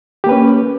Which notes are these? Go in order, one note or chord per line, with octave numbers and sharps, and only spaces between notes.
A#3 C#4 G4 B4